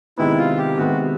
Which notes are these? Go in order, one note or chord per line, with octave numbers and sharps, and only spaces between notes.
C3 D#3 G#3 B3 E4
F4
G4
C3 D#3 G#3 B3 F#4